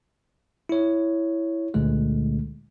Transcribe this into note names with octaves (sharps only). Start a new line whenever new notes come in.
E4 C#5
C#2 A#2 D3 G#3 A3